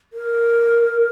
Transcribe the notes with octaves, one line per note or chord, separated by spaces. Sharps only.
A#4